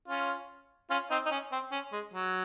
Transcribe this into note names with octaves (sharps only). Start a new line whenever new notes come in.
C#4 F4
C#4 F4
C4 D#4
D#4
C#4
C4
C#4
G#3
F#3